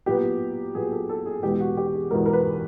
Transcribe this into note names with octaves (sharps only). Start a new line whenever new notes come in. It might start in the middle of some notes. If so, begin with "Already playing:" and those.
A#2 F#3 B3 G4
A#2 F#3 B3 G#4
A4
A4
G#4
E2 B2 G#3 B3 G4
F#4
G4
G#4
E2 B2 G#3 B3 A#4
A#4
B4